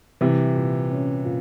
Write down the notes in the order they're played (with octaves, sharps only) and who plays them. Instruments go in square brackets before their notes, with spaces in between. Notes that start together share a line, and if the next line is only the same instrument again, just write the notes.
[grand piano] C3 E3 [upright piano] G3
[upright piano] A#2
C#4
A#2